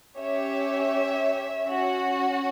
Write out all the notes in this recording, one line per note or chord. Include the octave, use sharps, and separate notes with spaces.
C#4 G4 C#5 E5
C#4 F#4